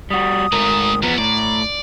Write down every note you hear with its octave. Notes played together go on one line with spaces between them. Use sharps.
G3 F#4 D#6
G#2 D3 A3 A#4
E2 F3 B3 A#5
A2 D5 A#5